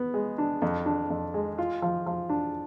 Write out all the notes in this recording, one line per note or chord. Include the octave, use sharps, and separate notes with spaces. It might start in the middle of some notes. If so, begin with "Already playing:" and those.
Already playing: B3
G#3
D4
F2
D4
F2
G#3
F4
F3
F3
D4